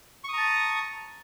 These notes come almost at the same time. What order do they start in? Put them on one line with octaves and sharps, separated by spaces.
C#6 D#6 A#5 A5